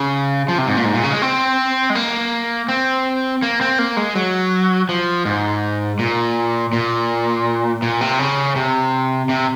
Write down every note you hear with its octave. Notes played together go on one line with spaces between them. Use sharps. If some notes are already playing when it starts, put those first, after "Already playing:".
Already playing: C#3
F3
C3
G#2
A#2
G#2
A#2
C#3
G#3
C4
G#3
A#3
C4
A#3
C4
A#3
G#3
F#3
F3
G#2
A#2
A#2
A#2
C3
C#3
C3
C3